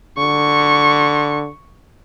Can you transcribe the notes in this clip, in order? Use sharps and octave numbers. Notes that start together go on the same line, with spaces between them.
D3 C#6